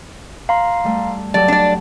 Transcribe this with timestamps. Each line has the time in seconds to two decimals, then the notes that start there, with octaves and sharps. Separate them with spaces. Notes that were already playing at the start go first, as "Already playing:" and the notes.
0.49 F5 A#5 C6
0.84 G3 A3
1.34 F#3 G4 A4 D5 A5
1.48 D4 D5 B5